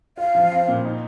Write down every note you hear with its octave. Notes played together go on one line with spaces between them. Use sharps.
F4 F5
F3
C4
A#2
D#4